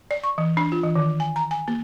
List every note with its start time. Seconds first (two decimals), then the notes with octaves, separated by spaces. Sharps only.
0.11 D5
0.24 C#6
0.38 E3
0.57 D4
0.72 F4
0.83 E3
0.96 D#3
1.20 G#5
1.36 A#5
1.51 G#5
1.68 A#3